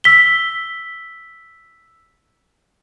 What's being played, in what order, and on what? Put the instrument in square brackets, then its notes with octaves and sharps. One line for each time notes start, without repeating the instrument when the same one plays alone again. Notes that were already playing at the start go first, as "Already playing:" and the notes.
[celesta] E6 B6 G7